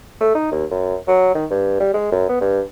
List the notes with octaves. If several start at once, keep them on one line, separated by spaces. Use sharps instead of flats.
A3
D#4
D#2
F#2
F#3
D#3
G2
G3
G#3
F#2
B3
G2